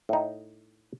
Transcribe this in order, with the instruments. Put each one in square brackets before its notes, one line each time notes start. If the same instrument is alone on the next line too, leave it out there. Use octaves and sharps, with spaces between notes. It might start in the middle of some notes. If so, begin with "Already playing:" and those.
[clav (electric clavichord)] A2 D#4